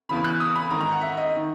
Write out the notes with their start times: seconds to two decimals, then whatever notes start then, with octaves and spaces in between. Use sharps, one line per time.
0.09 E2 C#3 E3 B5
0.24 F#6
0.40 D#6
0.55 B5
0.70 G#2 D#3 A#5
0.81 A#5
0.92 F#5
1.01 E5
1.17 D#5
1.36 D#3